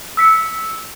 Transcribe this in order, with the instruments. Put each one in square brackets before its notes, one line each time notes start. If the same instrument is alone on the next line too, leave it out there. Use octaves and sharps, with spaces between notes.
[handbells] E6 B6 C#7